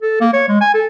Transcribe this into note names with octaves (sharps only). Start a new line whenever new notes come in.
A4
A#3
C#5
G#3
G#5
A4